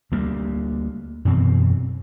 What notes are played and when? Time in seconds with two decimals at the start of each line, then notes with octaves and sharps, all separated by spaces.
0.12 D2 G3 A#3
1.25 F#2 B2 E3 C4